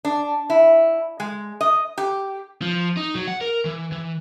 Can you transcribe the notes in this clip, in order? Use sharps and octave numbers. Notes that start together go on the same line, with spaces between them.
D4
E4
G#3
D#5
G4
F3
D#4
F#3
F#5
A#4
E3
E3